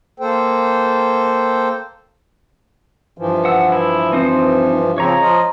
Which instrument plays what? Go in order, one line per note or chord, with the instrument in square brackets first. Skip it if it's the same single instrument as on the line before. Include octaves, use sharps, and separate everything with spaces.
[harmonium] A#3 A4 C5 G5
G2 E3 F3
[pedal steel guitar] F#5 E6
E4
C4 D#4 C5
[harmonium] C#3 F3 C4 [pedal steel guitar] C#5 A#5
[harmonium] F3 F4 D#5